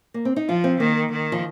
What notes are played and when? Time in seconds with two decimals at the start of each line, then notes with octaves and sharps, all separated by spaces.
0.14 A#3
0.25 C4
0.36 D#4
0.48 F3 F4
0.64 C4
0.80 D#3 A#3
1.11 D#3
1.32 F3